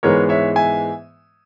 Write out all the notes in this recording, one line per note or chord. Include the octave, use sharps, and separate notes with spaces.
G#2 E3 G#3 B3 A#4 C#5
C#5 E5
E5 G#5